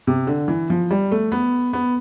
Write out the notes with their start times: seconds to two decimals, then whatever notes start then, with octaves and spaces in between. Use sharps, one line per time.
0.07 C3
0.27 D3
0.48 E3
0.70 F3
0.91 G3
1.12 A3
1.32 B3
1.73 B3